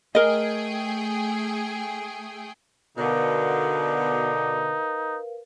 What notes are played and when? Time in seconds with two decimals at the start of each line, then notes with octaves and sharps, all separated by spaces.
0.15 A3 G#4 A#4 D#5 G5
2.98 B2 D3 D#4 A#4 B4 F5